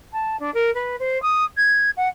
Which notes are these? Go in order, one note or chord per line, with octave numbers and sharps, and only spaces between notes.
A5
D4
A#4
B4
C5
D#6
G#6
F#5